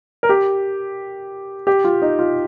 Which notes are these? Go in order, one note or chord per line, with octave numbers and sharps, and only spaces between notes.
A#4
G4
G4
F4
D#4
F4